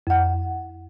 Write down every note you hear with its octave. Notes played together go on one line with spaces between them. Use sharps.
F2 F#5